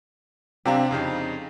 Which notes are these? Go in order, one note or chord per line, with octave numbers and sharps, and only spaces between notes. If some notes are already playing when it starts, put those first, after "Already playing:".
C3 C4 D4 G4 F5 A#5
F2 C#3 D#4